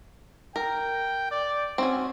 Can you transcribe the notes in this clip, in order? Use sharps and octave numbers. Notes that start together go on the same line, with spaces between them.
A#4 G5
D5
C4 C#4 F#4 G#5